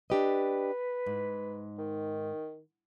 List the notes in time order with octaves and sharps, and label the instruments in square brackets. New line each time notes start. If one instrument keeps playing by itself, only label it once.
[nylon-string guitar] D4 G4 D#5 [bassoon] B4
[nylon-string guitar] G#2
[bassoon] D#3